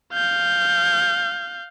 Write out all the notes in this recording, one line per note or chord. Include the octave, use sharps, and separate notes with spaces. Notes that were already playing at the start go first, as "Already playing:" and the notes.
F5 G6